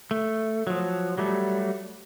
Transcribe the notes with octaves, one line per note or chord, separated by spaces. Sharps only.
A3
F3 F#3
F#3 G3 A3